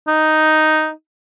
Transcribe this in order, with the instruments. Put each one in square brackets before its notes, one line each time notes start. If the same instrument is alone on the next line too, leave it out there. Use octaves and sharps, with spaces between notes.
[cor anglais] D#4